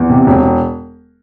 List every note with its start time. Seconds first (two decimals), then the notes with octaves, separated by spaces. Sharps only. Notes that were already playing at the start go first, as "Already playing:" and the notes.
Already playing: E2
0.10 C3
0.27 E1